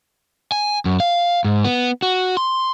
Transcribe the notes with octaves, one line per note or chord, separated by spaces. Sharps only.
G#5
F#2
F5
G#2
B3
F#4
C6